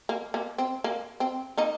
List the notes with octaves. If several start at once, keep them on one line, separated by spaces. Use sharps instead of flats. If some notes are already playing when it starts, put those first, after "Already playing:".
A#3
A#3
C4
A#3
C4
A#3 D#4